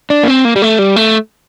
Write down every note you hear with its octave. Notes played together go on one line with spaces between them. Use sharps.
D4
A#3
C4
A#3
G3
A3
G3
A3